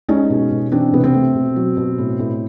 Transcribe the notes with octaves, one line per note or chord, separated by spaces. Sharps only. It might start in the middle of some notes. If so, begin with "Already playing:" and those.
G#3 C#4 D#4
B2
B2
E3 C4 D4
C3 B3
C4
A3
B2
F#3
B2
A2
A2